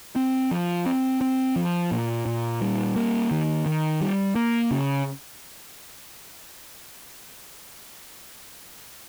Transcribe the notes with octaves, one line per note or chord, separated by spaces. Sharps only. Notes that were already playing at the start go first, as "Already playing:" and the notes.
C4
F3
C4
C4
F3
A#2
A#2
G3
A#3
D#3
D#3
G3
A#3
C#3